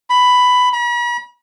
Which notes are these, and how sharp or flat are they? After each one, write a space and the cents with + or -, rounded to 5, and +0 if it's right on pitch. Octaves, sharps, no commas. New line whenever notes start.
B5 +10
B5 -45